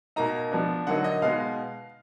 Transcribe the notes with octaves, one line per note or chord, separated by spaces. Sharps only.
B2 A#3 D#4 A#5
F3 B3 D4
D3 F#3 A#3 D#4 F#5
D#5
B2 G#3 B3 D#4 F5